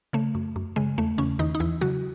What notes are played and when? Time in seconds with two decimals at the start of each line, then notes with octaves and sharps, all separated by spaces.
0.13 C#3 A3
0.35 F#2
0.56 F#2
0.76 C#3 G#3
0.98 E2 A3
1.18 E2 C#3 C#4
1.39 E2 D#3 D#4
1.55 D#4
1.60 E2 E3 E4
1.81 C#3 F#3 F#4